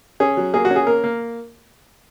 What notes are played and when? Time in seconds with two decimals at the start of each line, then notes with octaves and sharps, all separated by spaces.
0.20 C#4 G#4
0.37 F#3
0.54 A#3 G#4
0.65 F#4
0.71 C#4
0.76 G#4
0.87 A#3 A#4
1.04 A#3